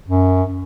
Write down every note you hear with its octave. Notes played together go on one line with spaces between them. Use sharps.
F#2